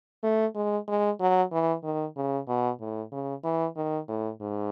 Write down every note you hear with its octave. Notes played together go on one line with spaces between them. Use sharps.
A3
G#3
G#3
F#3
E3
D#3
C#3
B2
A2
C#3
E3
D#3
A2
G#2